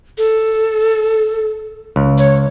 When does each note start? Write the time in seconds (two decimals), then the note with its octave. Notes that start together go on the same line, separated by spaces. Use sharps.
0.18 A4
1.96 C#2
2.18 C#5